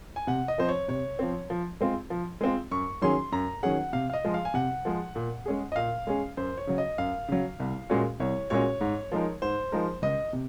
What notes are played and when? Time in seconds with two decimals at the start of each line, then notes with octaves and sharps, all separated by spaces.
0.16 G#5
0.27 C3 F#5
0.48 D#5
0.58 F3 C4 C5
0.69 C#5
0.88 C3 C#5
1.19 F3 C4
1.50 F3
1.81 G#3 C4 F4
2.10 F3
2.41 G#3 C4 F4
2.71 F#2 C#6
3.01 D#3 F#3 C#4 G#4 C6
3.32 F#2 A#5
3.63 D#3 F#3 C#4 G#4 F#5
3.93 C3 F5
4.10 F5
4.13 D#5
4.25 F3 G#3
4.34 F5
4.45 G#5
4.54 C3 F#5
4.85 F3 G#3
5.15 A#2
5.46 G#3 C#4 G#4
5.72 D#5
5.76 A#2 F5
6.07 G#3 C#4 G#4
6.37 F#2 C5
6.58 C#5
6.67 C#3 F#3
6.78 D#5
6.98 F#2 F5
7.29 C#3 F#3
7.60 C2
7.90 A#2 G#3 C#4 F#4
8.20 C2 C#5
8.50 A#2 G#3 C#4 F#4 C#5
8.81 G#2
9.12 F3 G#3 D#4 A#4
9.42 G#2 C5
9.72 F3 G#3 D#4 A#4
10.02 C#2 D#5
10.33 C3